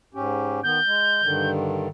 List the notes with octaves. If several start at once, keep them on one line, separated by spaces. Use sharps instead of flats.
G#2 C#4 G4
D#3 B3 G6
G#3
G2 D3 D#3